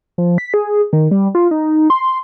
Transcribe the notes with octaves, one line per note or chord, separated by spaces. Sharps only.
F3
B6
G#4
D#3
G3
F4
D#4
C6